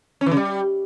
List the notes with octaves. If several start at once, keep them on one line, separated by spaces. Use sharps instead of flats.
C#4
E3
C#3
G3